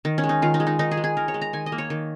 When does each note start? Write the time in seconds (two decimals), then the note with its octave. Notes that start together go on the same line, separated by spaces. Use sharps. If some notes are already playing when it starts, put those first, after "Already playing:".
0.05 D#3
0.18 C#4
0.24 G#3
0.29 D#4
0.42 D#3 F4
0.54 D#4
0.60 G#3
0.67 D#4
0.79 D#3 D#4
0.91 G#4
0.97 G#3
1.04 G#4
1.17 D#3 A#4
1.28 C#5
1.34 G#3
1.42 A#5
1.53 D#3 G#5
1.66 D#5
1.72 A#3
1.78 C#5
1.90 D#3